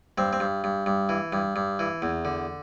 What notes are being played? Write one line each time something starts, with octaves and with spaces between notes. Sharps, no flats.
G2 C4
C4
G2
G2
G2
E3
G2
G2
E3
E2
D3